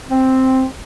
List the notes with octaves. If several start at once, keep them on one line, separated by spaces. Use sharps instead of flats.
C4